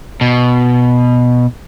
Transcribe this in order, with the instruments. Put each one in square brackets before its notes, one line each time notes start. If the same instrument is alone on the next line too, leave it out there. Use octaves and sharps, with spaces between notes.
[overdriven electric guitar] B2